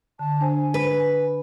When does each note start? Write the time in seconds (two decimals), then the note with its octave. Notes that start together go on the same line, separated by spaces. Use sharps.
0.19 D3 A5
0.41 D4 C5 G#5
0.74 B4